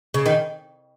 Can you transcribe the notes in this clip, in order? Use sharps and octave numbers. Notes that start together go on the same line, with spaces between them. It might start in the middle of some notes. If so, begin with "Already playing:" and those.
C#3
D#3